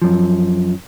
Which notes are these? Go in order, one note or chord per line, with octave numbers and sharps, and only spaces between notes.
F#2 F3